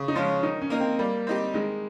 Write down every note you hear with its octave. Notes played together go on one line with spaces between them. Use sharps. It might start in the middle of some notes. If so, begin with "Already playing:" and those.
Already playing: C#3
D#4
F3 G#3 C#4 F4
D#3 D#4
C#4
A#3 D#4 A#4
C4
G3 A#3
C4 D#4 G4
D#3 G#3